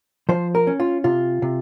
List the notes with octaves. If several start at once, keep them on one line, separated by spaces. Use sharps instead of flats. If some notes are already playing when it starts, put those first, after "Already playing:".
F3 C5
A#4
C#4
F4
C3 F4
C3